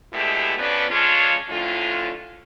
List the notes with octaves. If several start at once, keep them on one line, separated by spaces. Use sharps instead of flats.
B2 G#3 A3 D4 E4 G4
F2 B3 C#4 D4 B4 D5
F2 C#3 G#3 D4 F4 C#5
F2 A2 D3 C#4 F4